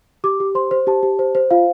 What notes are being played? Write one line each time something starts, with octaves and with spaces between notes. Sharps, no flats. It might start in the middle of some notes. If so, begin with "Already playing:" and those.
G4 D6
G4
C5 C6
C5
G4 A5
G4
C5
C5
F4 F5